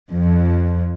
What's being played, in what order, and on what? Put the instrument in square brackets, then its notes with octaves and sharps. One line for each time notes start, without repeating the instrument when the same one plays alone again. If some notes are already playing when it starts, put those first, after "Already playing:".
[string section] F2